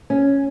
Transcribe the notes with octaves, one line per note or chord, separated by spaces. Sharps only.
C#4